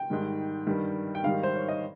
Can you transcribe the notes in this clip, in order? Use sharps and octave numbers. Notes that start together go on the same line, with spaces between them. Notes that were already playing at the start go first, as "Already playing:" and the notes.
Already playing: G5
G#2 D#3 G3
G2 D#3 G3
G5
G#2 D#3 G3 F5
C5
C#5
D#5